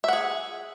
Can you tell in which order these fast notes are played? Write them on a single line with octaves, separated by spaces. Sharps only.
E5 F#5 G#4